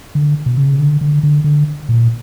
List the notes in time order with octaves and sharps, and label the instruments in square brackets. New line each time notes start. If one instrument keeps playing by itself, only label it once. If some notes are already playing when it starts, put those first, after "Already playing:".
[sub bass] D3
B2
C#3
D3
D3
D3
D3
A#2